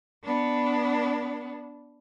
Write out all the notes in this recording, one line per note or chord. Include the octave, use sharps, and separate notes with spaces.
B3 D4